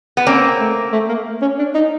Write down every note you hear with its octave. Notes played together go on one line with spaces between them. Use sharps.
B3
A#3 C4 C#4
A3
A3
A#3
C#4
D4
D#4